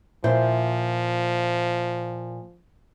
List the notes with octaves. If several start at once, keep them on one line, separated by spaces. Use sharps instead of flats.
A#2 F3 E4 C5